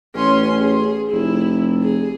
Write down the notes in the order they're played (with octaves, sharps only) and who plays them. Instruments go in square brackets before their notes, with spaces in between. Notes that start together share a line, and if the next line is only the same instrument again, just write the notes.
[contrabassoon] A1 [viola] C#4 C6
[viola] G#4
[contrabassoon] F1 [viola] E4
[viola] G#4